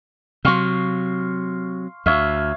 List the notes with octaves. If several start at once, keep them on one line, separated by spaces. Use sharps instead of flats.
C3 F#3 F5 C6 C#6
D2 C#5 E5 F5